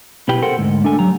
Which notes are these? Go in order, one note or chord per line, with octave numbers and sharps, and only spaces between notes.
B2 E4 G4 B4 G5 B5
A4 A#4 C5 F#5 G5
D2 G#2
A3 D4 A4 G#5
F#3 G4 A#5